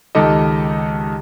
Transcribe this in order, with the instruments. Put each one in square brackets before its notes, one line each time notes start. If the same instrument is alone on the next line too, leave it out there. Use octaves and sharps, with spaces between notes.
[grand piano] C#2 D#3 G4 A4 D#5